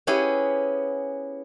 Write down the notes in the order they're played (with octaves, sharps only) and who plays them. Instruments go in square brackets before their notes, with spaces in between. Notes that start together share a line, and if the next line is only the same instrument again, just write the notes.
[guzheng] B3 C#4 E4 G4 G#4